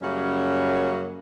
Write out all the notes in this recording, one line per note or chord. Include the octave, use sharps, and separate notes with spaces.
F#2 C#3 F#3 G3 A#3 C#4